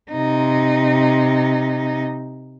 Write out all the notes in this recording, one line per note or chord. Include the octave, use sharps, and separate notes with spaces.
C3 D#4